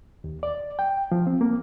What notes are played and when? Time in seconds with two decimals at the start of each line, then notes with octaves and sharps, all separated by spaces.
0.24 D#2
0.43 D5
0.79 G5
1.12 F3
1.27 C4
1.41 A#3